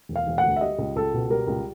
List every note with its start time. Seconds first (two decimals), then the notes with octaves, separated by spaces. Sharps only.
0.09 E1
0.16 F5
0.27 E1
0.38 F#5
0.44 D2
0.56 E5
0.61 G3 D#5
0.79 C#2
0.96 C#2 A4
1.14 B2
1.30 G3 A#4
1.47 C#2